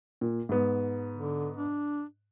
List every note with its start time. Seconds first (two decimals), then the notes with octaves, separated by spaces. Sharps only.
0.21 A#2
0.49 G#2 B3
1.17 D3
1.57 D4